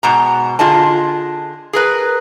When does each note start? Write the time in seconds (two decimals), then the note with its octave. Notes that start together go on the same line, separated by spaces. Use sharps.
0.03 G#2 B2 A#5
0.59 D3 F4 G#4 D#5 A5
1.73 G#4 A#4 B4